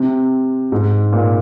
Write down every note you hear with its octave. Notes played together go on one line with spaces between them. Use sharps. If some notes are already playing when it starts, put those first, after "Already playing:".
Already playing: C3
G#2
A#2